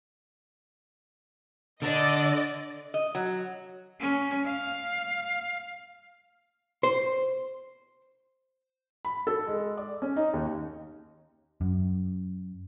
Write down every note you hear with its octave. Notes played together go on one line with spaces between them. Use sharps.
D3 D4 D5 D#5
D#5
F#3
C#4
F5
C5
B5
A4
G#3
D5
C#4
D#4
D#2
F#2